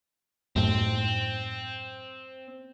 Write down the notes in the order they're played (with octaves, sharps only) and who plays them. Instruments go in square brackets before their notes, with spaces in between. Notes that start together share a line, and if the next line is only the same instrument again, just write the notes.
[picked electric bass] F#2 A2 [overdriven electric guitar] C4